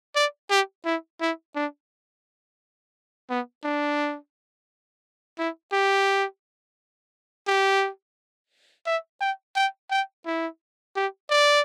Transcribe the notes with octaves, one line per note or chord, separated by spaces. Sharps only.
D5
G4
E4
E4
D4
B3
D4
E4
G4
G4
E5
G5
G5
G5
E4
G4
D5